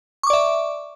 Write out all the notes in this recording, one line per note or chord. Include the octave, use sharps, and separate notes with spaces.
D5 E5 C#6 D6